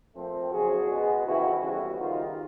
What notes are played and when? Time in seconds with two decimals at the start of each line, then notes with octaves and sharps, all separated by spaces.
0.15 A#2 F3 A3 C4
0.51 E2 C#3 F#3 F#4 G#4
0.88 B2 G#3 B3
1.25 F2 C#3 E3 E4 F#4
1.61 F2 C#3 E3 G3 B3 E4 F#4
1.98 G#2 D#3 G3 D#4 F4